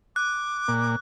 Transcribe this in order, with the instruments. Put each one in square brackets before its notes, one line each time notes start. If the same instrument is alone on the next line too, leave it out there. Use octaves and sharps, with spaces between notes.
[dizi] D6 [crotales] F#6
[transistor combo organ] A#2